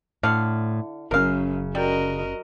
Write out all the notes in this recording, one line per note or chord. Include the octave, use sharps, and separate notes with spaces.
A2 D3 F5
F#1 F#2 C#3 C#4 A#4 F5
G3 F#4 A#4 D#5